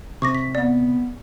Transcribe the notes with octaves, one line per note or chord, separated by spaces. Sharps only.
C3 C#6 D6 A#6
B6
B3 D5